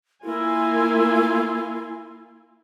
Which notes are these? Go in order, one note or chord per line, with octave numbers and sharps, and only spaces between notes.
A#3 E4 F4 G#5